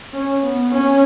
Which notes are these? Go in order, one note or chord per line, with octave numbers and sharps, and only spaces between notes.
C#4
B3
C#4